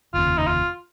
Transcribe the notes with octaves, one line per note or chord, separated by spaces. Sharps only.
F1 D#2 C#3 F4
D#4
F4